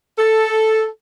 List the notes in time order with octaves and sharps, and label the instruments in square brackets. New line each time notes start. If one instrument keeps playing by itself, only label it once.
[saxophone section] A4